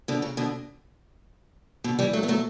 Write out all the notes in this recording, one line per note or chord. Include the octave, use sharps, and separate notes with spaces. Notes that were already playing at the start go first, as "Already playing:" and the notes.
B2 D3
C#3
B2 D3
B2 D3
E3 G3
F#3 A3
B3
F#3 A3